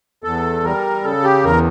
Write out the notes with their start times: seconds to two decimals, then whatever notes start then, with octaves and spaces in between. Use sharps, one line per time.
0.24 E2 A4
0.63 G3 A#4
1.04 C#3 A4
1.24 G4
1.43 E2 A#4